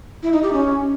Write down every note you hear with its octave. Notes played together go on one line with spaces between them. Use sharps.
E4
D#4
G4
C#4